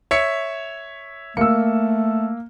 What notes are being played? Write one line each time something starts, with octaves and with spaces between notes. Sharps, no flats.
C#5 E5 C#7
A3 A#3 E6 C#7